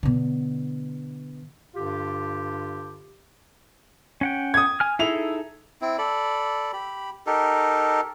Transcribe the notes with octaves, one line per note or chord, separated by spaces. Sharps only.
B2 D3
G2 D3 F4 G4
C#4 F#5 G5
D#6 G#6
G#5 F6
D#4 E4 G#4 A4 F7
C4 E4
A4 D5 B5
G4 B5
D#4 G4 A4 A#4